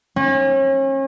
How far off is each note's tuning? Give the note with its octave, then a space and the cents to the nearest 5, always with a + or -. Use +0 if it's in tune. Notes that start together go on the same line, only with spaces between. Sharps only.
C#4 -35